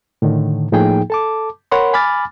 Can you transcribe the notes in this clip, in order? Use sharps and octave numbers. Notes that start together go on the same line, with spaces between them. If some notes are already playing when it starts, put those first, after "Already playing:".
A2 D3 D#3
A2 F3 A#3 D#4 G#4 G5
A4 A5 D6
A#4 C#5 F#5 B5 C6
G#5 B5 D6 F6 A6